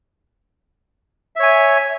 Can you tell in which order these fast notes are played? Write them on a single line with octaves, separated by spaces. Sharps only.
E5 C#5 G#5